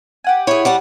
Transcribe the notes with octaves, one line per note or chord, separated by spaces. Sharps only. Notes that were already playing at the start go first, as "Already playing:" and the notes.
G4 F#5 G#5
E4 G#4 C#5
G3 F#5 A5